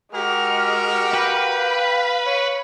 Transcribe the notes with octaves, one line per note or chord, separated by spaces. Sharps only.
G#3 F#4 G4 A#4 F6
B4 F5 G5 B5
C#5